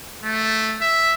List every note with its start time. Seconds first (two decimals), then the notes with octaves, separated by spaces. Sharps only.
0.23 A3
0.81 E5